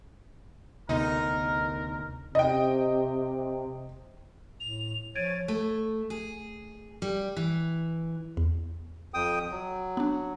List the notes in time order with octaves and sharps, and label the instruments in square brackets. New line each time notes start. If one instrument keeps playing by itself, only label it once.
[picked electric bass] D2 B3 [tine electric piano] C3 [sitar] D#4 [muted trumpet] A#4
[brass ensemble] C3 [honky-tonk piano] D#5 G5
[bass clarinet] A2 [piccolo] F7
[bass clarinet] F3 [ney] C#5 [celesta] G#6 D7 D#7 [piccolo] A6
[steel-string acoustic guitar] A3
G#4
G3
E3
[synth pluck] E2
[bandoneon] F2 G5 D#6
F#3
[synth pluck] B3 D4